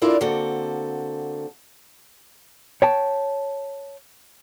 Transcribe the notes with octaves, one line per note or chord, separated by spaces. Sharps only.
D4 E4 F4 A4 A#4 D5
D3 A#3 C4 F#4 A4
C#5 G5 A5